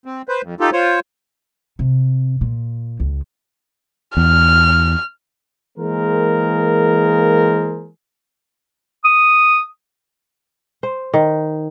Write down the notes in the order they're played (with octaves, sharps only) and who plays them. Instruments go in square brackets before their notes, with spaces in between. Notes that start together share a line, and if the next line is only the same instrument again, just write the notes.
[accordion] C4
B4 C5
F2
D#4 F4 G4 A4
F4 C5 C#5
[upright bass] C3
A#2
C#2
[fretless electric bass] E2 [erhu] F6
[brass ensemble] E3 G#3 A#3 G#4 A#4 C5
[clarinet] D#6
[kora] C5
D#3